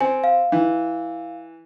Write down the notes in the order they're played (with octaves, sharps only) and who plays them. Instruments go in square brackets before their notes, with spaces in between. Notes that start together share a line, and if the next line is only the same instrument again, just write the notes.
[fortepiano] C4 [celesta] G#5
[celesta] F5
[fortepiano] E3